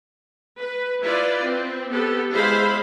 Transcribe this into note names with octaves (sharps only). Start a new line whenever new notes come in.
B4
E4 F4 B4 D5
C4
B3 G4 A4
G#3 E4 C5 F5 B5